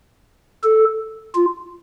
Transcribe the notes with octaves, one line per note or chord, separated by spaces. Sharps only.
A4
F4